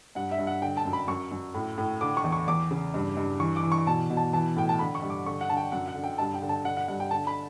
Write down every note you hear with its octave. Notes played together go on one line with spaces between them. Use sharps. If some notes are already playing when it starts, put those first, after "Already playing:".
G2 F#5
E5
G2
F#5
D3 G5
A5
F#2
B5
F#2 C#6
F#2
A2
A2
D3 D6
C#6
E2
C#6
E2 D6
C#3
G2
G2
E3 C#6
D6
E3
C#6
B2 A5
B2
A5
E3 A5
A2 G5
A5
D3 B5
C#6
G2
D6
D3 C#6
F#5
D3 A5
G5
F#2 F#5
F#5
D3
G5
G2 A5
G5
D3
A5
D3 F#5
F#5
G2 F#5
G5
D3 A5
B5